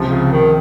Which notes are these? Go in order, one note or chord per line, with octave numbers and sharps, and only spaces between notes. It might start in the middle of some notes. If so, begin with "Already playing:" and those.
Already playing: C#2 C3 F3
C#3
D#3